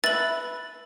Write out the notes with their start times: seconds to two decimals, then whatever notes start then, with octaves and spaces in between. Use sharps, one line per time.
0.04 B4 E5 A6 F#7